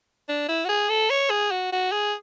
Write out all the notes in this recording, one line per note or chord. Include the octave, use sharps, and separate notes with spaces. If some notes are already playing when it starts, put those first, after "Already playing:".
D4
E4
F#4
G#4
A4
C#5
G#4
F#4
F#4
G#4